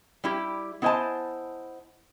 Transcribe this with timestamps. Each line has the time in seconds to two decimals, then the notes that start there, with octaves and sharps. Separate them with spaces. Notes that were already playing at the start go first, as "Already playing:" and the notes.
0.24 G3 E4 G4
0.82 B3 E4 C5 D#5 G#5 A5